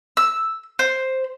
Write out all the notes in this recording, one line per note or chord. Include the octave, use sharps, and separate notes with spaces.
E6
C5